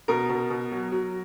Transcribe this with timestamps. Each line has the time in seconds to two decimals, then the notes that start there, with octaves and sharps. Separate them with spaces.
0.08 B2 A#4
0.29 B2
0.50 B2
0.72 F#3
0.92 F#3